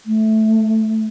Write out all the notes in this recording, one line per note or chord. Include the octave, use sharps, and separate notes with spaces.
A3